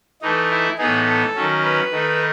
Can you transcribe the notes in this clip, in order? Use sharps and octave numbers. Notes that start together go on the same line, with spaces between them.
E3 A3 D#4
E4
A2 E3 B3 D#4 G#4
A4
D#3 F#3 C#4
B4
D#3 A3 D#4